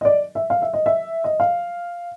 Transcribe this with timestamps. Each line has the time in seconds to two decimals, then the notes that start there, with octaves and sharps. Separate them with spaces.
0.01 D#5
0.05 D5
0.35 E5
0.50 F5
0.62 E5
0.74 D#5
0.86 E5
1.24 D#5
1.40 F5